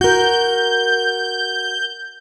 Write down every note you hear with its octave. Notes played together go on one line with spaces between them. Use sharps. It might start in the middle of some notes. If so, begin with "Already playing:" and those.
F#4 A#4 G6